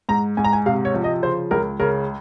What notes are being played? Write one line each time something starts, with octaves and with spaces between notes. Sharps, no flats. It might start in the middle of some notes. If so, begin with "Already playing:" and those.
G#2 A#5
G#2 G#5
A#5
G#5
C3 F5
C#5
F3
D#5
C#3 C5
C#2 A#4
C#3 A#4